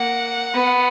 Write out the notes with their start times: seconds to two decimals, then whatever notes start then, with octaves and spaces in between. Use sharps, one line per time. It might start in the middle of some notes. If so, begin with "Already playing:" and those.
Already playing: A#3 F#5
0.55 B3